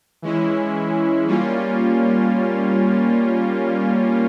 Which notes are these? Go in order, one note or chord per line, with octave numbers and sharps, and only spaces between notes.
E3 G#3 C#4 E4
G3 A#3 C#4 F4